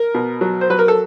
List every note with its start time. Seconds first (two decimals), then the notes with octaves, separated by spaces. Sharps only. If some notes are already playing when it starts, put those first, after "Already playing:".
Already playing: A#4
0.14 B2
0.41 F#3
0.61 C5
0.70 F#3 B4
0.79 A#4
0.88 A4